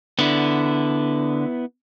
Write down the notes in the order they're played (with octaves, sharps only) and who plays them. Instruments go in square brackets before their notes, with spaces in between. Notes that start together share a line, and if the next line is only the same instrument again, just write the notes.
[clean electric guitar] D3 [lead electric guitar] B3 E4